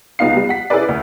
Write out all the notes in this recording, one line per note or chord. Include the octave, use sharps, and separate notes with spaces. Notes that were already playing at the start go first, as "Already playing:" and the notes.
C#2 B3 D#4 F5 C7
G3
F#5 B6
C#4 E4 G#4 A#4 B4 D5
D2